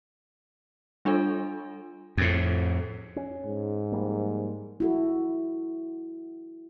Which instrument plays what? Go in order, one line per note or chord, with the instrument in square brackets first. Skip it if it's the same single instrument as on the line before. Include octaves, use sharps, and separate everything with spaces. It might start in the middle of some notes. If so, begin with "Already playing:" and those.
[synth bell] G3 D4 F4 A4
[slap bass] F2 A2
[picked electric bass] C#4
[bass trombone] G#2
[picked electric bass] F3 G3 A#3
[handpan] E4 F#4 A4